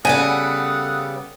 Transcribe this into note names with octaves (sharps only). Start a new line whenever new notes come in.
C#3 G3 B3 A4 F#5 G#5 D#6